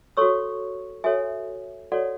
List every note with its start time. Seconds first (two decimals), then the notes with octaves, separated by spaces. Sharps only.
0.17 F#4 A4 C#5 C#6 E6
1.04 F#4 A4 C#5 E5 G#5
1.92 F#4 A4 C#5 D5 F#5